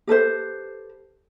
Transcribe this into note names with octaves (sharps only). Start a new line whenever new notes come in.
G4 A4 B4 C5